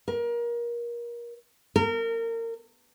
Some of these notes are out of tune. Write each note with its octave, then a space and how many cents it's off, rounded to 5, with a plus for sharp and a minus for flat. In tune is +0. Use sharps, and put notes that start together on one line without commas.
A#4 +25
A#4 -30